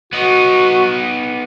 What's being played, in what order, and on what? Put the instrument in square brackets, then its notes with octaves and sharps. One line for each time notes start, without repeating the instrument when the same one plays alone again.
[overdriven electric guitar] B3 D#4 [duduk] F#4